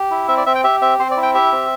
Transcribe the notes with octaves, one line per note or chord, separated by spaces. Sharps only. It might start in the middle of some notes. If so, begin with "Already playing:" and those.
Already playing: G4
E4
C4 E5
D5
C4 E5
G5
G4 E5
C4 E5
C4 C5
D5
E4
G5
G4 E5
C4